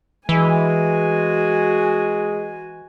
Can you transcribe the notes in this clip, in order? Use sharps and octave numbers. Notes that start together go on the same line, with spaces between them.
E3 G#3 F#4 G#5